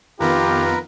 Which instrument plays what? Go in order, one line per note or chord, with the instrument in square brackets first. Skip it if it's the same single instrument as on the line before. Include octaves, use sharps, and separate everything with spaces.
[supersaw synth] F2 D#3 B3 [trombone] F4 [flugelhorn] G4 [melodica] A#4 B4 A#5